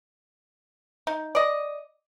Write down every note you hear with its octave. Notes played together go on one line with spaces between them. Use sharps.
D#4
D5 D#5